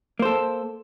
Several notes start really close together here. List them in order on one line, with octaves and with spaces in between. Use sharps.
A#3 C5 A4